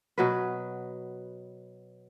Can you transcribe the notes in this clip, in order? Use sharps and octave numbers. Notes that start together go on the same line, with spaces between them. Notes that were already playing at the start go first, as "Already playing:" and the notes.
B2 F#3 B4